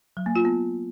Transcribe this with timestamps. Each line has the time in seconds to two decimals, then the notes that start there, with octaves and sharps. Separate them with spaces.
0.17 F#3
0.26 A#3
0.36 F4
0.45 B3